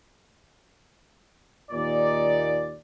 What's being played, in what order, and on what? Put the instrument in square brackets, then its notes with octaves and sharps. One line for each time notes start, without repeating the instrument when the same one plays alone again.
[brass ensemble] D#2 A#2 D#4 D5